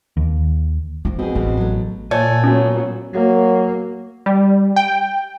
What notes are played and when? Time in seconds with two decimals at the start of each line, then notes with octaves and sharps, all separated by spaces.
0.17 D#2
1.05 F3 F4
1.19 B2 C4 G#4
1.35 A1 G3 G#3 C4
1.57 F#3 A3
2.11 A#2 A3 C#5 D5 G#5
2.44 F#3 B3 C#4 F#4
3.14 F#3 A#3
4.26 G3
4.76 G5